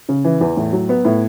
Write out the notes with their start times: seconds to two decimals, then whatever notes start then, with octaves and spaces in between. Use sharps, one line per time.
0.09 C#3
0.24 E3
0.41 E2
0.57 A2
0.73 F#3
0.89 B3
1.05 A2